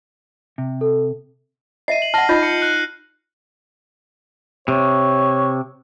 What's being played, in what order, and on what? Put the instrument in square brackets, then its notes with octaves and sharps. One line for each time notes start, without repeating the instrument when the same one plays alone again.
[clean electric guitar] C3
[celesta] A4
[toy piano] D#5 E5 [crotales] C7 D#7
[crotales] F#7
[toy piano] F#5 A5 [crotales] F6 A#6
[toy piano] D#4 F4 D#5 [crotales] G6
[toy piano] E6 [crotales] C#7
[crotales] F#6
[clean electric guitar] C3 [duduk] C#5